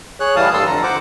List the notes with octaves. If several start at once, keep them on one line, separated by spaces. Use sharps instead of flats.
G#4 C#5 F#6
A2 E3 G3 F5 A5 D#6
G2 A4 A5 C6 E6
F2 D3 A#5
C5 F#5 D6